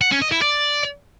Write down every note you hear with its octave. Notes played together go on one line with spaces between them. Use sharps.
F#5
C#4
D#5
E4
D5